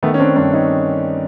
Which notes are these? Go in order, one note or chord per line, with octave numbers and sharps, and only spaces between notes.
D#3 A3 B3
C#4
C4 D4
G2 C4 D4
C#4 D#4